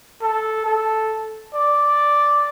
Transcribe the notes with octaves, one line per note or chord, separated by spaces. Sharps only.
A4
A4
D5